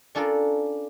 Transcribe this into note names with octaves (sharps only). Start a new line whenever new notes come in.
C#4 D4 F4 A4 A#4